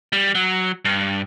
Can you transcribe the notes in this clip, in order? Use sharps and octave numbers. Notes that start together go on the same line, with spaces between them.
G3
F#3
G2